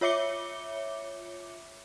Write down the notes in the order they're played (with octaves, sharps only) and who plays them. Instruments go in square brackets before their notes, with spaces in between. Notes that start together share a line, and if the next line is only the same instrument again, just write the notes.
[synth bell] F4 C#5 E5 D6 C#7 G7